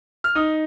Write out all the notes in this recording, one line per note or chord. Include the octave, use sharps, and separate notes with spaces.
F6
D#4 D#6